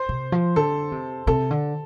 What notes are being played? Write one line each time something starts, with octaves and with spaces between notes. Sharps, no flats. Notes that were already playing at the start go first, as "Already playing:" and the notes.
Already playing: C5
C3
F3
D3 A4
C3
C3 A4
D3